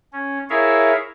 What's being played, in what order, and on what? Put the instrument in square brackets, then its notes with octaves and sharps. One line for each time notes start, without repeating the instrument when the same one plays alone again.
[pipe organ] C#4
E4 G#4 A#4 C#5 E5 F5